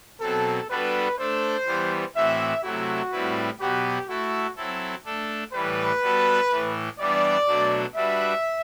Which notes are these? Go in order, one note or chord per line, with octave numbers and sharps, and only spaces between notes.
B2 F#3 C4 A4
G3 B3 D4 F#4 A4 B4
A3 D4 A4 C5
E3 G3 B3
A2 E3 A3 C4 F#4 E5
C3 F#3 A3 E4 F#4
A2 G3 C4 E4 B4
B2 F#3 B3 F#4 G4 B4
A3 E4 F#4 A4
F#3 C4 E4 A4
A3 D4 A4
A2 E3 G3 B4
G3 B3 F#4 A4
A2 E3 A3
E3 G3 B3 D4 D5
B2 F#3 A3 D4 F#4
G3 D4 F#4 B4 E5